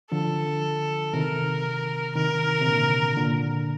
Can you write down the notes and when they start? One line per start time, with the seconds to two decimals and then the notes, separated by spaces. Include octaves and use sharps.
0.12 D3 F3 A4
1.14 C3 D#3 A#4
2.15 C3 D#3 A#4
2.62 C3
2.66 A#2 D3
3.17 A#2 D3